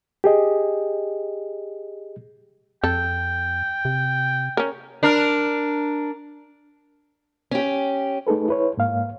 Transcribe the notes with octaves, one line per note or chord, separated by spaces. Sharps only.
G4 G#4 D#5
F2 A4 G5
C3
C#4 A#4
D4 A#4
C#4 G4
A3 D#4 G#4 A4 B4
E4 B4 C#5
G#2 A#3 F5